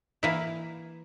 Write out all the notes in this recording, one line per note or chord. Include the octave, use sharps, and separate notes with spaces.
E3 A#3 E4